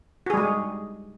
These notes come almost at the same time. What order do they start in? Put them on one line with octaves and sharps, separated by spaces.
F#4 G#4 G3 G#3